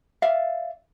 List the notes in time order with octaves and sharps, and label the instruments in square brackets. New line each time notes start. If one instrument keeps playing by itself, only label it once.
[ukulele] D5 E5 F5